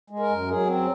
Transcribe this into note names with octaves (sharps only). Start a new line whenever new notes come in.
G#3
A#4
F#2
F#3 G#4
C4